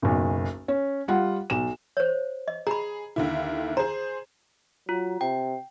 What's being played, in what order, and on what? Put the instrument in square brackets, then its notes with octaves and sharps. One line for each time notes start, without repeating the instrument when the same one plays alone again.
[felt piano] F#1 B1
C#4
G3 F4 F#5
B1 E7
[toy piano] C5 C#5
D#5
[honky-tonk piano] G#4 [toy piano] A#5 B5
[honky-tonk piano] D#2 D3 E4
[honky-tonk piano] G#4 C5 [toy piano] A#5
[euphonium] F#3 [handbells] F4
[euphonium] C3 [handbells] G5